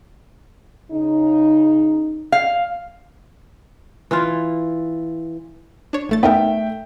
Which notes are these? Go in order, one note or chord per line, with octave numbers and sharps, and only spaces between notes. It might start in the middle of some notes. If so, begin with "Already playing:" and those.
C#3 D#4
F5
E3 E4 F4
D4 C#5
A1 A3 A6
A3 B3 D#4 A#4 E5 G5